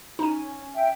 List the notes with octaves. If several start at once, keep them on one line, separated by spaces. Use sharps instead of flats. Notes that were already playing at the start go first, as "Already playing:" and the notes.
C#4 D#4 D#7
E5 G5